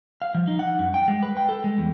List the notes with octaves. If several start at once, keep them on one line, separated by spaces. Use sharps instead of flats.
F5
F3
D#4
F#5
F#2
G5
G#3
B4
G5
A4
G#3
E2